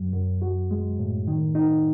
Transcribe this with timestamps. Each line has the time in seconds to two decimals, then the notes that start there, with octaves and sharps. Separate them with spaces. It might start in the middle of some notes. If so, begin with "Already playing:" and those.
Already playing: F#2 F#3
0.13 F#2
0.42 F#4
0.71 G#3
0.99 A2
1.27 D#3
1.55 D#4